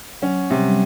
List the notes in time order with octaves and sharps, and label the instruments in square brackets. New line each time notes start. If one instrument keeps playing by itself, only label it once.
[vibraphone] F#3 [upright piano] C#4
[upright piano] C3 [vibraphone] G3
[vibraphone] G3